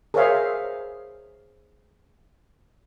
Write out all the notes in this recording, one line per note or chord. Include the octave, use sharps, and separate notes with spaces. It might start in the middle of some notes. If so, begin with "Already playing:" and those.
G#4 A#4 C5 C#5 E5 F5